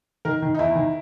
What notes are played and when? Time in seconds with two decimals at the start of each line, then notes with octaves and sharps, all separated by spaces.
0.25 D#3 A#4
0.42 D#3
0.54 D#4
0.59 E2 E4
0.75 D#3